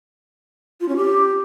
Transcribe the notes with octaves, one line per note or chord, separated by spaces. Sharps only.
F4
C#4
G4